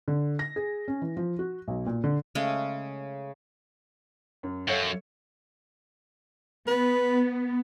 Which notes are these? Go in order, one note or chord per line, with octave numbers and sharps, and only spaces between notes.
D3
A#6
G#4
C#4
E3
F3
F#4
B1
A#2
D3
C#3 G#3 A3 C#4
F#2
F#2 A4 C#5 F5
B3 B4